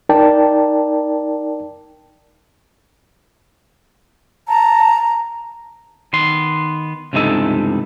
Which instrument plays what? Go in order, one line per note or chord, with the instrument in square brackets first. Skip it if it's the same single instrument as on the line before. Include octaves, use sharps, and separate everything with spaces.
[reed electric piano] D#4 A#4 D5 G5 A5
[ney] A5 [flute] A#5
[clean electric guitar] D#3 B3 C6
C#2 G2 C3 E3 D#4 A4